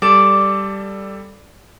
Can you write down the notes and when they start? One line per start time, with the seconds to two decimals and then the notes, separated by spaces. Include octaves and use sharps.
0.02 G3 A4 D5 E7